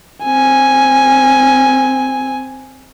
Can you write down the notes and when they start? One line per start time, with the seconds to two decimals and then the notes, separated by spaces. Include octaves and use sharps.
0.25 C4 G#5